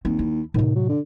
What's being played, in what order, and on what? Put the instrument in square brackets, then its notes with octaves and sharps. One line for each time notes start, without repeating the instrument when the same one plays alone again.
[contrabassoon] D#2 [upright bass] C4
[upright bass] E4
[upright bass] A2 C3 [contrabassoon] D#3
[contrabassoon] F#3
D3